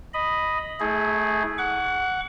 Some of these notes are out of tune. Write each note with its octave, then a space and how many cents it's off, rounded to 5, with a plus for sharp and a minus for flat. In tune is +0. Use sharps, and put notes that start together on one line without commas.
D#5 +0 B5 +0
A3 +0 E4 -40 G#4 +10
F#5 +0 C#6 +40